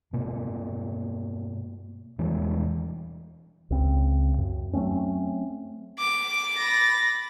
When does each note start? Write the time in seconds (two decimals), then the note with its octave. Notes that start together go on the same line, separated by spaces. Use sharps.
0.13 G2 B2 A#3
2.18 E2 E3 G3 G#3
3.70 C#2 C#3 C4
4.38 F#2
4.73 F#3 A3 C4 C#4
5.99 D6
6.56 B5 A6 A#6